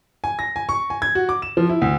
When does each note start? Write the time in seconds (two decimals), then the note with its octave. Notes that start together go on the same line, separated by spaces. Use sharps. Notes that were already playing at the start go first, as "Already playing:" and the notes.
0.24 G#5
0.39 A#6
0.56 G#5
0.69 C#6
0.90 G#5
1.02 G#6
1.15 F#4
1.29 D6
1.42 E7
1.57 F3
1.69 E4
1.82 D2